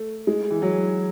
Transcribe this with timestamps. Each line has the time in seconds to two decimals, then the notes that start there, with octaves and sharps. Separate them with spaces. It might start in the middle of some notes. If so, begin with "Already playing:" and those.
Already playing: A3
0.27 G#3
0.50 E3
0.62 F#3